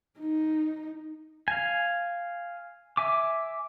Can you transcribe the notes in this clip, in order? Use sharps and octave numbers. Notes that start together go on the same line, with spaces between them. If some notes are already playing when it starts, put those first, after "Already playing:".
D#4
F5 G#5
E5 G#5 D6